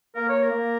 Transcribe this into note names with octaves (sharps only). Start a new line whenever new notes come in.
A#3 A#4
C#5
A#4
A#3